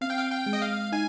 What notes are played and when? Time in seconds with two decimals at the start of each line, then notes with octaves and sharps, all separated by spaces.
0.01 C4 F5
0.10 G5
0.19 F5
0.31 G5
0.46 G#3
0.53 D#5
0.62 F5
0.92 D#4 G#5